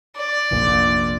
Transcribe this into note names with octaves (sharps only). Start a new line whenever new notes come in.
D5
F1 A#1 A#2